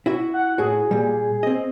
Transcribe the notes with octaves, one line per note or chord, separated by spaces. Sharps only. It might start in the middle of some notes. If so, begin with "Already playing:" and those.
E4 F#4 E5
F#5
A2 F#4 G#4
A#2 G3
C4 D#5